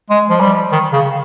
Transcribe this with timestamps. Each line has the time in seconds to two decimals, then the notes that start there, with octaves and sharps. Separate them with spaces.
0.10 G#3
0.30 F3
0.41 G3
0.72 D#3
0.93 C#3